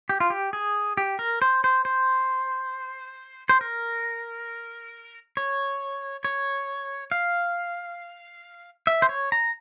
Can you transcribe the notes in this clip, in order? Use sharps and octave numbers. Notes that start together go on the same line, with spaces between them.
G4
F4
G4
G#4
G4
A#4
C5
C5
C5
C5
A#4
C#5
C#5
F5
E5
C5
C#5
A#5